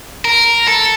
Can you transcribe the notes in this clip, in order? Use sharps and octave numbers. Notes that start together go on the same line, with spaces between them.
A#4
A4